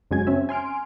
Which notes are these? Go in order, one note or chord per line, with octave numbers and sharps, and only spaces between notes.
F#2 C#3 G#3 F#4 G#5 G#6
C4 C#4 E5
G#5 C6 F6 D7